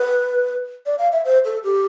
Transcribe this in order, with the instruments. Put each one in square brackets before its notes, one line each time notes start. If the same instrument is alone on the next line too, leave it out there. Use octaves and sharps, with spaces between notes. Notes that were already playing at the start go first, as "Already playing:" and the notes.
Already playing: [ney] B4
D5
F5
E5
C5
A4
G4